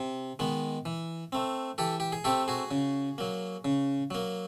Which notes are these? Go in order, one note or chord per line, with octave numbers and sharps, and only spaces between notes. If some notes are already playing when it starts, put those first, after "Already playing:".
Already playing: C3
D#3 G#3 B3
E3
A3 C4
E3 G4 A4
G4
G#4
A3 C4 G4 A4
F#4 G#4
C#3
F#3 A#3
C#3
F#3 A#3